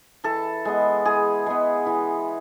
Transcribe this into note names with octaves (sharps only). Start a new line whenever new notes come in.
E3 A4
G#3 B3
E3 G#4
G#3 B3
E3